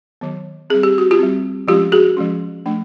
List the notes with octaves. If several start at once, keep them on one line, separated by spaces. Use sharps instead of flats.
D#3 F#3 B3
G3 C4 G#4
G4
F#4
F4 G4
G3 C4
F3 G#3 C#4 F4 G4
F#4 G#4
F3 G#3 C#4
F3 A3 D4